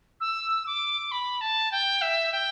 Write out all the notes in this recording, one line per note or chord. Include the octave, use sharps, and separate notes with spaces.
E6
D6
B5
A5
G5
E5
G5